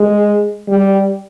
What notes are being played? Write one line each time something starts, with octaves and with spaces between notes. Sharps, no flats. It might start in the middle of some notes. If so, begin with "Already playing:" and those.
Already playing: G#3
G3